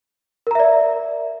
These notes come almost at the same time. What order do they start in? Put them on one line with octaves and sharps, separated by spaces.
A#4 A#5 E5 D5